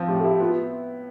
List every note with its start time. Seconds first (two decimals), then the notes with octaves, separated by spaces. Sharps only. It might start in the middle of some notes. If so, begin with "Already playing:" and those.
Already playing: F3 C4
0.08 A2 G4
0.20 A4
0.24 E4 G4
0.40 B3 F4